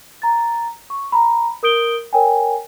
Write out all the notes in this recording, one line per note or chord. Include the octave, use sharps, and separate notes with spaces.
A#5 A6
C#6
A#5 B5
A#4 D#6 G6 D7 G7
A#4 C#5 G5 G#5